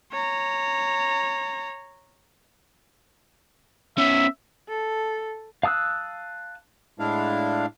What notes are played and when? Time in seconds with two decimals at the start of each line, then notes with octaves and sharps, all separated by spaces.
0.11 C#5 A#5
3.98 B3 C#4 E5
4.69 A4
5.63 F5 A5 D#6 E6 F#6
6.99 A2 G#3 D4 E4 F5